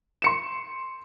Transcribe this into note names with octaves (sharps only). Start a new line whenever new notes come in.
C6 C#7 E7